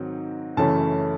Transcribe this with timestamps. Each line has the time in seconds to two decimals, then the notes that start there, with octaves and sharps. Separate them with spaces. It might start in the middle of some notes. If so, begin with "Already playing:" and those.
Already playing: G#2 D#3 F#3 C4
0.57 F#2 C#3 E3 A3 A5